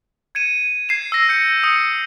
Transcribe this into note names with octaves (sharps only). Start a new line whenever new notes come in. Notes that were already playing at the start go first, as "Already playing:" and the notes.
G#6 C#7 D#7 E7
G#6 C7 E7
E6 A#6
G6 C#7
D#6 C#7